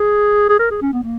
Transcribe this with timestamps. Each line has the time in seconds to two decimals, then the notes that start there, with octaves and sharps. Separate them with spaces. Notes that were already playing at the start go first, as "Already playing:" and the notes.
Already playing: G#4
0.49 G#4
0.59 A#4
0.71 G#4
0.82 C#4
0.93 B3
1.03 A#3